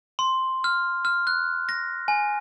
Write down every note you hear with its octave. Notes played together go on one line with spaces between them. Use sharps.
C6
F6
F6
F#6
A#6
G#5